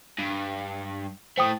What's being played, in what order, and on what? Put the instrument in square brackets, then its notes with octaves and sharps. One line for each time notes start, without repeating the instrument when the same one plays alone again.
[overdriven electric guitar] G2
[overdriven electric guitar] A2 A3 [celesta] C5 G5 D#6